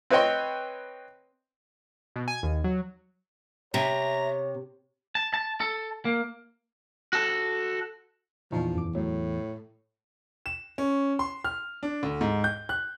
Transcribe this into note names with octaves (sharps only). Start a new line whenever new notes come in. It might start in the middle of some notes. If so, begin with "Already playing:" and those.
C4 B4 C#5 D#5 G5 C6
B2
G#5
D#2
F#3
C3 C#5 E5 A#5
A5
A5
A4
A#3
F#4 A4
B1 E2 A#2 F3 D#4
F#2 D6
A2 F#3 A3
E7
C#4
C6
F6
D4
D2
G#2
G6
F#6